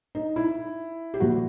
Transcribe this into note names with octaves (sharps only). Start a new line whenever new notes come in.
D#4
E4
G4
A#2 F3 F#4